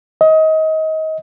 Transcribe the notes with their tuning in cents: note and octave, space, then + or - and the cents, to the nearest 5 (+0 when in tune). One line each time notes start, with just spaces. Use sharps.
D#5 +25